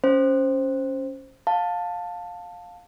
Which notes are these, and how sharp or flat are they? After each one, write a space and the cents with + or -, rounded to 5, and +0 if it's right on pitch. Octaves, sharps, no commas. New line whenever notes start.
C#4 +0 C5 +5
F5 +20 A5 +10